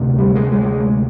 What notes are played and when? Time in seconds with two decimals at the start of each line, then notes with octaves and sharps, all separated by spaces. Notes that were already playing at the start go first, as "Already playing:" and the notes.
Already playing: D2 C3
0.19 G3
0.35 G#3
0.52 G#3